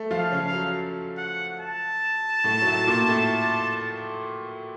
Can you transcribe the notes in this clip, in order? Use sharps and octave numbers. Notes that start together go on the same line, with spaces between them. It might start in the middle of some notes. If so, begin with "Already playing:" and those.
Already playing: A3 A4
F3 F4
F5
C#3 C#4
F5
F#3
F#5
A5
A2 A3
F#3
A2 A3
A#2 A#3
A2 A3